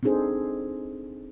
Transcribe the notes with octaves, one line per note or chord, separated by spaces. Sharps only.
C4 D4 D#4 G#4 A4 C5